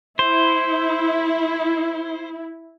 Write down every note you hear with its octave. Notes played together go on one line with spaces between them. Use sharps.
E4 C5